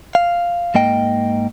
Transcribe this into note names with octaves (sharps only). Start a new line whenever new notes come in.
F5
G#2 A#3 D#5 G5